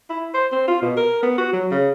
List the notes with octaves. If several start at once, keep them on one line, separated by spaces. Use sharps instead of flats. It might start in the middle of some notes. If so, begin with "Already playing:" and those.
E4
C5
C4
F4
B2
A#4
B3
F#4
F#3
C#3